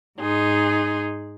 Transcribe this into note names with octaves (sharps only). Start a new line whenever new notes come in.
G#2 D#4 G#4 C6